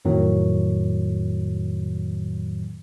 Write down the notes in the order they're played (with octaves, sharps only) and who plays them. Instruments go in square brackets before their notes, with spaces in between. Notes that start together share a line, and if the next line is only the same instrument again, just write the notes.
[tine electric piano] F2 A2 D#3 F#3